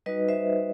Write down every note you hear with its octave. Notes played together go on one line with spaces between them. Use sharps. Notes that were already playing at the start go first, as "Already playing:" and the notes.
G3 D#4 F#4 B4 D#5
C5 E5